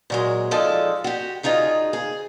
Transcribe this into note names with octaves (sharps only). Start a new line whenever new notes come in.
A#2 F#3 G#3
F3 G#3 D#4 A4 D5
F#4 G4
D2 D#4 F4 G#4 D#5
G#4